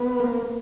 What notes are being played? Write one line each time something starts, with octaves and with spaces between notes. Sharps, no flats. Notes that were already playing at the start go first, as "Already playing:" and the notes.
Already playing: B3
A#3